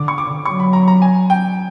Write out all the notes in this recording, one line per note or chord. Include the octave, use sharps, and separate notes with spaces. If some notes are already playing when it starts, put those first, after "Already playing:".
Already playing: D3 D6
C#6
D6
F#3 C#6
B5
A#5
A#5
G#5
G5